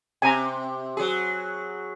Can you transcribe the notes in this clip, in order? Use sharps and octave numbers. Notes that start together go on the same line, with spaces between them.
C3 G#5 A#5
F#3 G#4